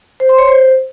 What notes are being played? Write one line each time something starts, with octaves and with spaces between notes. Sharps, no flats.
C5
C6
C#5
C5